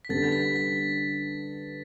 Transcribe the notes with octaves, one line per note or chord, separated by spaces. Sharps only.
B6
D3 G3 B3 D4 A4 A6
B6
B6